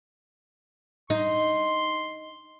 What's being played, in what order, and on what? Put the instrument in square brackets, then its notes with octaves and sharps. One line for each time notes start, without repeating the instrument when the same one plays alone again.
[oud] D#4 [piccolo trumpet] C6